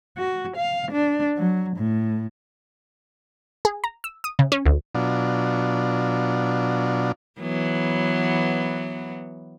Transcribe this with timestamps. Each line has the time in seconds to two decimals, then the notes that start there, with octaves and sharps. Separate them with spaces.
0.18 F#4
0.57 F5
0.92 D4
1.38 F#3
1.77 A2
3.65 G#4
3.84 A#5
4.04 E6
4.24 D#6
4.39 C#3
4.52 C#4
4.66 D2
4.95 B2 F#3 D4 F4
7.40 E3 F#3 B3